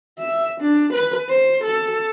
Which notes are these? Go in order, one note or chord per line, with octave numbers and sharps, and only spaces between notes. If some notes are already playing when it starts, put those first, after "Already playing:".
E5
D4
B4
C5
A4